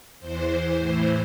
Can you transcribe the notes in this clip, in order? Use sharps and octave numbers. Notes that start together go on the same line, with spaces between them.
E2 E3 C5
A2 E3 C5